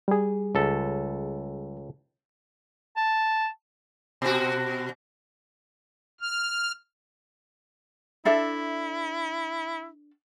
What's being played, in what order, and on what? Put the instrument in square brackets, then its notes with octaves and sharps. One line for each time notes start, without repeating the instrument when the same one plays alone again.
[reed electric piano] G3 G#4
[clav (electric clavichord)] C#2 A4
[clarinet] A5
[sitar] B2 F#4
[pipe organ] F6
[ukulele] D4 A4 E5 [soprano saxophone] E4